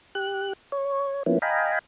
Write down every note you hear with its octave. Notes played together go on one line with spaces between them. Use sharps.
G4 F#6
C#5
F3 A#3 B3 C#4 E4
D#5 F5 G5 G#5 A#5 B5